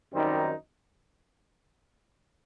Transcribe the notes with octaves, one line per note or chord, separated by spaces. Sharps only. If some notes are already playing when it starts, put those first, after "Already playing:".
F#2 D#3 G3 C4 D#4